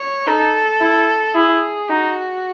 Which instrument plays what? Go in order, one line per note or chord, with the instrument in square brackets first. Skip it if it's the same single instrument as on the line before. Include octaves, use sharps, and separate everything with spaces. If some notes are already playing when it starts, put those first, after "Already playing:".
Already playing: [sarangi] C#5
[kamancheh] D#4 [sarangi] A4
[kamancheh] E4
[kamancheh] E4 [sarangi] G#4
[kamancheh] D#4 [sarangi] F#4